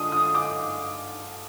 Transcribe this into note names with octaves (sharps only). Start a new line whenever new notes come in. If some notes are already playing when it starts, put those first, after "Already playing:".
Already playing: D3 G#3 D4 F4 D#6
D#6
D6